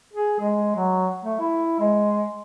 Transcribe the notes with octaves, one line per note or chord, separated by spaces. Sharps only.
G#4
G#3
F#3
A3
E4
G#3